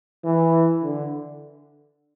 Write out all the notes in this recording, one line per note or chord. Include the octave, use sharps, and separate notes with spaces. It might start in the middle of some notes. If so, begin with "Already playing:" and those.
E3
D3